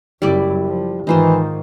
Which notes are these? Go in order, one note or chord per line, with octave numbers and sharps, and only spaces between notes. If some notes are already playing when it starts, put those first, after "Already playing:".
F#1 F#2 G3 E4 D5
F3
G#2 D#3 E3 D#4 F4 C5